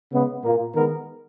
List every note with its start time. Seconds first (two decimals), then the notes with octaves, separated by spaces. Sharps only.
0.12 C#3 G#3 B3
0.44 A#2 A#3
0.75 D#3 G#3 B3 A#4